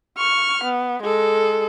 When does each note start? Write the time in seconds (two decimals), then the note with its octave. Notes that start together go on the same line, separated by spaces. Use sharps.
0.18 C#6 F6
0.64 B3
1.02 G#3 A4